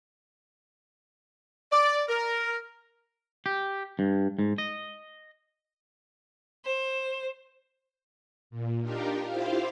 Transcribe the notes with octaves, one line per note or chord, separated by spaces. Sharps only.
D5
A#4
G4
G2
G#2
D#5
C5
A#2
D4 D#4 F4 G4 A#4
E4 F4 G4 C5 F5